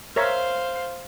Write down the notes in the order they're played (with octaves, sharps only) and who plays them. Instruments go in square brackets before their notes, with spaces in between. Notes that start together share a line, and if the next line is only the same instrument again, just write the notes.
[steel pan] A#4 C#5 E5 [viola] C5 F5